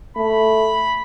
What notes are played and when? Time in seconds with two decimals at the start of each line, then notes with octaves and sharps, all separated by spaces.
0.17 A3 B5